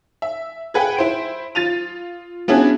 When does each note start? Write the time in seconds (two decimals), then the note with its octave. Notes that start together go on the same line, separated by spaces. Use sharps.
0.22 E5
0.74 G#4 B4 F#5 G5
0.97 E4 C5 D7
1.55 F4 A6 D#7 F7
2.48 B3 C#4 D4 E4 F#4 G#4